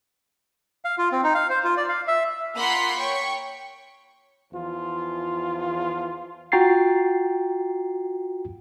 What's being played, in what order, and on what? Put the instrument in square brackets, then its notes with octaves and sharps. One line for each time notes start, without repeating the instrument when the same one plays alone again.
[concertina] F5
F4
C4
D#4
F5
C5
F4
D5
F5
E5
[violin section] A#3 F4 F#5 B5 C6 B6
C#5 G5 C#6
[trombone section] E2 F3 F4
[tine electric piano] F4 F#4 G5 A#5 A6 C7